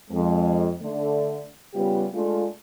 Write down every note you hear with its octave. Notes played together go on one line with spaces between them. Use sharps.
F2 G#3
D3 A3
C#3 G3 B3 F4 G4
G#3 A3 D4 F4